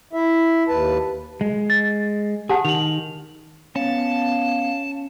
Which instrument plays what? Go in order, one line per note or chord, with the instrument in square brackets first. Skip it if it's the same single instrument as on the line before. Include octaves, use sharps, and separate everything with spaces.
[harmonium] E4 E5
D#2 B4 A5
[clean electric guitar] G#3
[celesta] A6
[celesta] G4 F#5 A5 [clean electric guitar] G#4
[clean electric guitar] D#3 [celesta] F7 F#7
[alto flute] B3 [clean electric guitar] C#4 [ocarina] F5 [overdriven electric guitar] A5